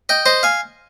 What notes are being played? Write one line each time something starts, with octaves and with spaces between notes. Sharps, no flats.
D#5 G5
C5 D#5
F5 G#5